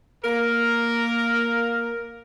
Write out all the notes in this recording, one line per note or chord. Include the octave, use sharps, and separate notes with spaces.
A#3 A#4